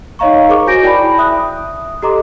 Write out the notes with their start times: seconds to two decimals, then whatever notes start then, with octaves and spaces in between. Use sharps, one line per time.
0.19 D#4 C#5 D#5 F5 A#5 C#6
0.49 G#4 A#4 C5 C#6 D6
0.66 F#4 G#5 G6 A#6 D7
0.82 E4 D5 G5 A5 B5
1.18 E5 D#6 F#6
2.02 G4 A4 D#5 A#5 C6 D6